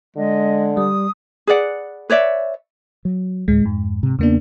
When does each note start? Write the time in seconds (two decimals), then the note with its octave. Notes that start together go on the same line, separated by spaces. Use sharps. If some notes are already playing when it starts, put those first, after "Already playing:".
0.17 D3 G#3 D#5
0.77 G3 D#6
1.47 G#4 B4 D5 F#5
2.10 B4 C#5 D5 E5
3.05 F#3
3.48 D2 A2 G#3
3.65 F2 G#2
4.03 C3
4.19 E2 C#3 A#3 B3 D4